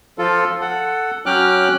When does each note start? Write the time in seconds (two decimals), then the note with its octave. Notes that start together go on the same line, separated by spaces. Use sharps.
0.18 F3 F4 A4
0.61 A4 F#5
1.26 F#3 C#4 G5 D6 F6 F#6